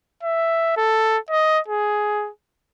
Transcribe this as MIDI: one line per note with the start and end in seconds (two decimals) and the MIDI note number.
0.23 0.76 76
0.77 1.18 69
1.30 1.59 75
1.68 2.30 68